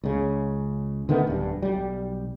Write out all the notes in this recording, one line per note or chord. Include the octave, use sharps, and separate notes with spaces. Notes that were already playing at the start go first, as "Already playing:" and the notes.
C#2 C#3
D3 D#3 A3 B3
D1 G2
B1 G3